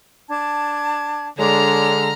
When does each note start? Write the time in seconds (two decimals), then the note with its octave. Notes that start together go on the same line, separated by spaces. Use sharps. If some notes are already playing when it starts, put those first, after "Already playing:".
0.29 D4 A5 G#6
1.39 D3 G#3 D4 C#5 A#5 F6